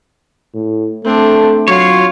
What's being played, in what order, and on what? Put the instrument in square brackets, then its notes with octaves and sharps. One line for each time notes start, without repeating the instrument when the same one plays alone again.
[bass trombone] A2
[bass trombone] A3 [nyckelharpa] C4 D4
[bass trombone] F#3 [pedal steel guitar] F4 C#5 [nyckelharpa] F5